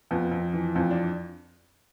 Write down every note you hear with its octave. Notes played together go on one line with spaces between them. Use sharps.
F2 B3
F2
E3
F2 C4
D4